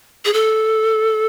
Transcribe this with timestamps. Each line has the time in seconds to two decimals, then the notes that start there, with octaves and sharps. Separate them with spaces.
0.25 G#4
0.34 A4